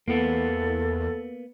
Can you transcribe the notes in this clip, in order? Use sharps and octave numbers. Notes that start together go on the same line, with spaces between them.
E2 A#3 B3 A4